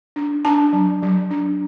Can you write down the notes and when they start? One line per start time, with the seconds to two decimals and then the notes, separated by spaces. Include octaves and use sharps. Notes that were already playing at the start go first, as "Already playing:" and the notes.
0.16 D4
0.45 D4 A5
0.73 F#3
1.02 F#3
1.31 D4